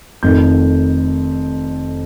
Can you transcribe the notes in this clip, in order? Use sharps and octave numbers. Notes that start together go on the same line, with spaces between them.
F1 F2 D#3 G6